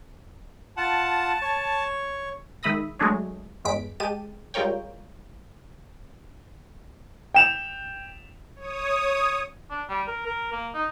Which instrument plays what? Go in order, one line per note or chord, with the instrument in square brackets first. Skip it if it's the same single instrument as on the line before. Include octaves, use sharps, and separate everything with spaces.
[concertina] F4 F#5 [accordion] A5
[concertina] C#5
[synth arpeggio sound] D#3 G#3 E5 B5 D#6 A#6
F#3 G#3 A3 D4 G#4 C#5
E2 G2 G#3 B6 D7
G#3 G4 A5 D#7
G3 G#3 F4 A#4 C#5 G5
[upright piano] G5 E7 F7
[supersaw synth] C#5 D#6
[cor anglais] D4
G3
A#4
A#4
A#3
D#4